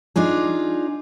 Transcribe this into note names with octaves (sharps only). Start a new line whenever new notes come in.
D4 D#4 F4 G#4